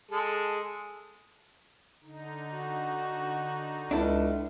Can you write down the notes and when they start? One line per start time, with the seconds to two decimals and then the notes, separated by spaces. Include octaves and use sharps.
0.11 G#3 G#4 A4
2.03 D3 D#4
2.52 F#4
3.91 C#2 D4 E4 A4